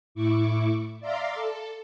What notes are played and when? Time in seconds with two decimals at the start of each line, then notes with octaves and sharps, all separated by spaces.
0.15 A2 E4 C#6 D6
1.00 D5 E5 F5 A#5 C6 D6
1.34 A4